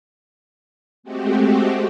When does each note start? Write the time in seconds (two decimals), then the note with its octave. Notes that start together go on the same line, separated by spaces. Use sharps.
1.03 G#3 A3 C4 F#4 G4